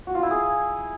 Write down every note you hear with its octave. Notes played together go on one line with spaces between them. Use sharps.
F#4
F4
E4
G#4